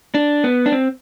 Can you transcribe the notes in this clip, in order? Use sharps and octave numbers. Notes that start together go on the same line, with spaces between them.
D4
B3
D4
C4